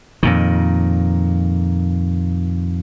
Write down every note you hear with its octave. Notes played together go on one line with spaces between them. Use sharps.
F2 A#2 D#3